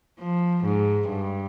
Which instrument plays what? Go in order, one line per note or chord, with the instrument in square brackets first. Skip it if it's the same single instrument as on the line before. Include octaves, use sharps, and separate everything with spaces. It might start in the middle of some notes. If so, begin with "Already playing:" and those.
[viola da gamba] F3
G#2
G2